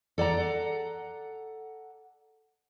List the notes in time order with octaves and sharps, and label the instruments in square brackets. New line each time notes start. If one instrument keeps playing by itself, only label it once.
[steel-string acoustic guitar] A4 D5 F#5 A#5